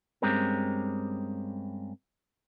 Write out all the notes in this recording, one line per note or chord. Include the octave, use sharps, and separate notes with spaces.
G2 G#3 C4 C#4 G4 A#4